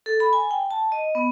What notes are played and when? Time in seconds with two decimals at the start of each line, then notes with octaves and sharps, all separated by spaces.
0.06 A4
0.20 B5
0.33 G#5
0.51 G5
0.71 A5
0.92 D#5
1.15 B3